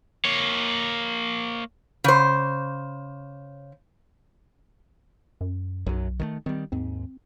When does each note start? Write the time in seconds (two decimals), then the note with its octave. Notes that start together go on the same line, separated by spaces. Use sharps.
0.25 A#3 C#5
2.04 C#3 C5
5.41 F#2
5.86 B1 F#2 F#3
6.20 D#3 G3 A3
6.46 D#3 G3 C4
6.72 D#2 G#2 C4